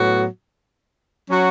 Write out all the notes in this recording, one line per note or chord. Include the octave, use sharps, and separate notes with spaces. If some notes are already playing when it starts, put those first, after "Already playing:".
Already playing: A2 F#3 B3 F#4
F#3 C#4 F#4